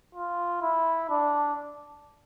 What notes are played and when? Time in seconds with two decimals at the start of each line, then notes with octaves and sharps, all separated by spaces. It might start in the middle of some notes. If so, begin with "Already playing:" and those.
0.15 F4
0.62 E4
1.10 D4